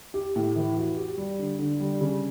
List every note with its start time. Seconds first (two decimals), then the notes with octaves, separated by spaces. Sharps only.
0.14 G4
0.36 A2
0.56 E3
0.77 F#4
0.97 G4
1.17 G3
1.39 D3
1.59 D3
1.80 G3
2.01 C#3